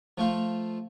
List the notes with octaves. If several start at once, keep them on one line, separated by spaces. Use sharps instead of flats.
F3 A3 F4